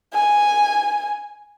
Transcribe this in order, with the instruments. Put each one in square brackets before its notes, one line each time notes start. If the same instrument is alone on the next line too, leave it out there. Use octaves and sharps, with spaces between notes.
[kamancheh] G#5